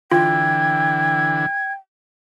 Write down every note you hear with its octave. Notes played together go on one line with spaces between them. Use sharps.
D3 E3 F4 G5 G#6